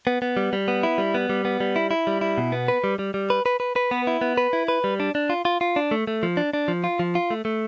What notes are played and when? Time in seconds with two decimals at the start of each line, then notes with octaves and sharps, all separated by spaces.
0.07 B3
0.22 B3
0.37 G3
0.53 G3
0.68 B3
0.83 E4
0.98 G3
1.14 B3
1.29 G3
1.45 B3
1.60 G3
1.76 E4
1.91 E4
2.07 G3
2.21 E4
2.38 B2
2.52 B3
2.68 B4
2.84 G3
2.99 G3
3.14 G3
3.30 B4
3.46 B4
3.60 B4
3.76 B4
3.91 B3
4.07 E4
4.21 B3
4.37 B4
4.53 E4
4.68 B4
4.84 G3
5.00 D4
5.15 D4
5.30 F4
5.45 F4
5.61 F4
5.76 D4
5.91 A3
6.07 A3
6.23 F3
6.37 D4
6.53 D4
6.68 F3
6.84 F4
6.99 F3
7.15 F4
7.30 A3
7.45 A3